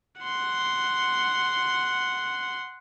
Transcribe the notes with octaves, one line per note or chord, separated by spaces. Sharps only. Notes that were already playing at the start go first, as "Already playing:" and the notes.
F#5 C6